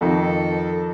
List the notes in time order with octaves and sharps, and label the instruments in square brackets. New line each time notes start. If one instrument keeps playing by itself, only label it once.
[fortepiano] F2 D#3 [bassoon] A4